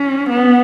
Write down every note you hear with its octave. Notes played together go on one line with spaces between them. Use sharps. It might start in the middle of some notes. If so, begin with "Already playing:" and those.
Already playing: C#4
B3